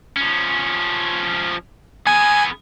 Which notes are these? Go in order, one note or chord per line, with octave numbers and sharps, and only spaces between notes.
F3 C#4
B3 G#4 G#5